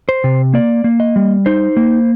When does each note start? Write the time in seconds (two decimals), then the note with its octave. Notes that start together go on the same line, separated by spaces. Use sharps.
0.09 C5
0.24 C3
0.54 A#3 D5
0.84 A#3
1.00 D#5
1.16 G3
1.46 D#4 C5
1.77 A#3